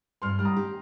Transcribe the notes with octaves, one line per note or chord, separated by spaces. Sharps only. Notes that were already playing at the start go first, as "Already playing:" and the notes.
G2 C6 F6
G3 F6
A#5 D#6
G4